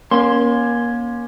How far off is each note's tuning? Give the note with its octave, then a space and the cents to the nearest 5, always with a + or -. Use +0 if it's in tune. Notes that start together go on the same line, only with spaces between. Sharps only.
A#3 +30 C#4 +0 C6 +0